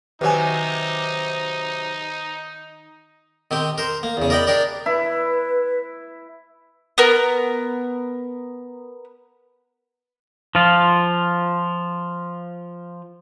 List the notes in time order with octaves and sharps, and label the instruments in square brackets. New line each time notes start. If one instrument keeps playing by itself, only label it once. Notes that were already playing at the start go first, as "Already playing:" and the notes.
[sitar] C3 F#3 [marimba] D#3 G4 [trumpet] D#4 [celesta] B4 G#5
[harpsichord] D#3 C4 G4
A#4 C5
A#3
E2 C#3
A#4 D5 D#5 G5 B5
D4 G4 A#4 D5
[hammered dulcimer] E4 [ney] B4
[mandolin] B3 A#4
[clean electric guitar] F3 F4